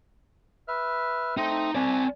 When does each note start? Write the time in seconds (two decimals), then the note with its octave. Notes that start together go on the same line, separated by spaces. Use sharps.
0.68 B4 E5 F6
1.37 A3 C4 D#4
1.75 C4 D5 G#5 A5